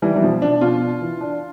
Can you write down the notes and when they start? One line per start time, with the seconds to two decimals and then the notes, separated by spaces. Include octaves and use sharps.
0.02 E3 G3
0.16 E3
0.22 B2 F3
0.42 B2 D4
0.61 B2 F4
0.82 D4
1.01 E3
1.21 D4